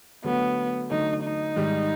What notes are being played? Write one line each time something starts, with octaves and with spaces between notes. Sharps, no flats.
D3 F#3 A3 B3
D3 F#3 A3 D#4
D#4
G#2 D#3 G3